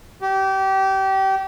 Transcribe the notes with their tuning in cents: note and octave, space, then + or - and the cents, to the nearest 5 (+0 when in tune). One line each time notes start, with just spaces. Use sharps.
G4 -25